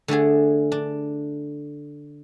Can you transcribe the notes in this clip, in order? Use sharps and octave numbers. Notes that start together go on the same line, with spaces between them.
D3 A3 D4 G#4
D4